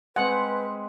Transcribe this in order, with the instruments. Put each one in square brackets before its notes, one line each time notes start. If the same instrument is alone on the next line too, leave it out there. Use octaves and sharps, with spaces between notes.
[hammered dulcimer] G#3 C4 [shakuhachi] B4 [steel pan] F#5